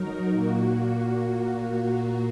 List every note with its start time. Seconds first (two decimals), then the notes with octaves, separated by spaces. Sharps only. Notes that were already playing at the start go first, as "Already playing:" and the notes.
Already playing: F#3 D#4 A#4
0.30 A#2 A#3 F#4